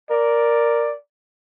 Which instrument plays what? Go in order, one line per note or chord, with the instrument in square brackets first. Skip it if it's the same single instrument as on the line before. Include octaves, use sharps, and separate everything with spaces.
[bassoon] A#4 [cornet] D5